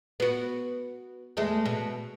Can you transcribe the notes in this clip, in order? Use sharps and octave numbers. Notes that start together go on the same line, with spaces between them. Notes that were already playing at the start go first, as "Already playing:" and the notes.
B3 F#4
E2 G#3 A3
B2